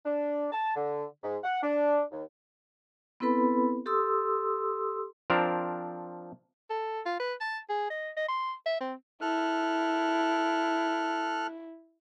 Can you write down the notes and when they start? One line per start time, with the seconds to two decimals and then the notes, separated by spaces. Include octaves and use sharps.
0.05 D4
0.52 A5
0.76 D3
1.23 G#2
1.43 F#5
1.63 D4
2.11 D#2
3.20 B3 C4 E4 A4 B4 B5
3.86 G4 A4 C6 D#6 E6
5.30 F3 C4 D4 A#4
6.70 A4
7.06 F4
7.20 B4
7.41 A5
7.70 G#4
7.90 D#5
8.17 D#5
8.28 C6
8.66 E5
8.81 C4
9.21 E4 A4 F6 F#6